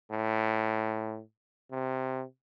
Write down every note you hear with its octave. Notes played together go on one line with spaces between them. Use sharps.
A2
C3